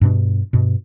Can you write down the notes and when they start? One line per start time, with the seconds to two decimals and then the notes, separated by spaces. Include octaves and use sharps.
0.01 G2 B2 D4
0.53 G2 B2